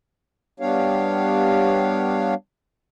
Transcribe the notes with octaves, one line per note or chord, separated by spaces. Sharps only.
G3 B3 D4 G4 C#5 F5